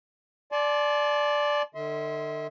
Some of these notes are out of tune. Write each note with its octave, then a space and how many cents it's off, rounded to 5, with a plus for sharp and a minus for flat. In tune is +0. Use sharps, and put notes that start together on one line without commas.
D5 +0 A5 -40 C6 +15
D3 +40 E5 -40 C6 -10